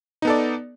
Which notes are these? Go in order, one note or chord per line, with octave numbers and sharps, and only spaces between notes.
B3 D#4 A4 D5